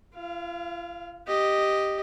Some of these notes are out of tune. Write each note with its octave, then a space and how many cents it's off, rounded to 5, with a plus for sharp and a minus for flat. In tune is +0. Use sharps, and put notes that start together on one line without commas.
F4 -45 F5 +0
G4 +0 D#5 +0